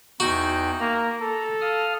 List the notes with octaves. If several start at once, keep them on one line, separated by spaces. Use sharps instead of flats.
E2 D#4 F#4 G5
A#3 A#5
A4
F5 D#6 F6